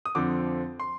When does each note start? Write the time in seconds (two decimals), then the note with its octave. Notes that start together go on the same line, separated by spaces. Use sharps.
0.05 D#6
0.15 F2 D3 F3 C4 D6
0.80 C6